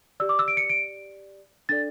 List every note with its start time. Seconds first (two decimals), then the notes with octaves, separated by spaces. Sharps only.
0.20 G4 D5 E6
0.29 D6
0.39 E6
0.48 D7
0.57 C#7
0.70 D7
1.69 D4 A4 D5 A6